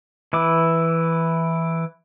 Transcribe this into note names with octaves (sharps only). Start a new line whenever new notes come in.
E3 E4 D6